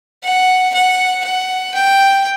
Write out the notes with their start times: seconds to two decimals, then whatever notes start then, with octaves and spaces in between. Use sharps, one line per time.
0.24 F#5
0.74 F#5
1.24 F#5
1.74 G5